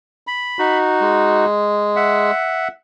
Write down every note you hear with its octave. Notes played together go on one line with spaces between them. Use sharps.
B5
D#4 F#4
G#3
E5 F#5